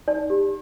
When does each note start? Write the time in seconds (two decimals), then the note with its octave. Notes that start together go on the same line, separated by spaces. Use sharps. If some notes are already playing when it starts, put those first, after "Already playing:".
0.08 D#4 D5
0.30 G4